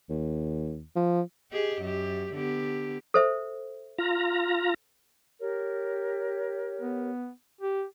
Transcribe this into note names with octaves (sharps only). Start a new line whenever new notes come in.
D#2
F3
G4 G#4 D#5
F#2 G4
D3 B3 G4
A4 C5 E5
F4 A#5
G4 A#4 C#5
B3
G4